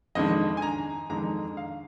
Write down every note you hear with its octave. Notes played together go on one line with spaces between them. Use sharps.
F2 D#3 G#3 D4 D#5
G#5
A#5
F2 D#3 G#3 D4 A#5
F5